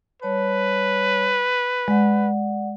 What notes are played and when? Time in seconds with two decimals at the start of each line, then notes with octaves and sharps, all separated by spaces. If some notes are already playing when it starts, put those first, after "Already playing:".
0.22 G3 B4 C#5 A5
1.88 G#3 D5 F#5